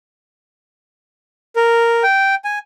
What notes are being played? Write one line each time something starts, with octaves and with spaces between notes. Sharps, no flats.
A#4
G5
G#5